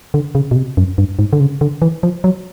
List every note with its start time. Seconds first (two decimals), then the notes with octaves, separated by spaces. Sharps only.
0.14 D3
0.35 C#3
0.51 B2
0.56 C3
0.77 F#2
0.98 G2
1.19 G#2
1.33 D3
1.40 C#3
1.61 D3
1.82 E3
2.03 F3
2.24 F#3